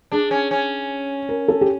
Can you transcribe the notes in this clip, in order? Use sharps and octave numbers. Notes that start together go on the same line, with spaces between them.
D4 G#4
C#4
C#4
A#4
A4
G4